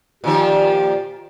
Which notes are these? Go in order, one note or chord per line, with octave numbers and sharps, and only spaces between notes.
A#2 D#3 F3 G4